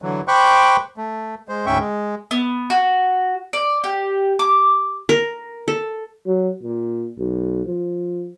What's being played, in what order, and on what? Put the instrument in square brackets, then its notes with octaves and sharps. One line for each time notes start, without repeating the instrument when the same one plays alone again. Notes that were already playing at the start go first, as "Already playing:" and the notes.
[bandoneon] D3 E3 F#3
C5 G5 B5 C#6 D6 F#6
A3
G#3 C5
D2 G#2 C#4 E5 G5 C#6
G#3
[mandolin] B3
F#4
D5
G4
D6
[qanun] A#4
A4
[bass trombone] F#3
A#2
B1
F3